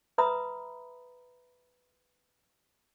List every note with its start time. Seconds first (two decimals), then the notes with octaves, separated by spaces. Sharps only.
0.18 B4 E5 A#5 B5 D#6